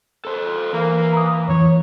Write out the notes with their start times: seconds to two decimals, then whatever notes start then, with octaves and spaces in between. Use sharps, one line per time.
0.25 A4 C5
0.73 E3 A#3
1.13 A#5 D#6
1.48 F2 E3 C#5